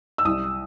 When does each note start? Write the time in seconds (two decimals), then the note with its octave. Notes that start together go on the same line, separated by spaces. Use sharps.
0.18 E6
0.25 C2 D#6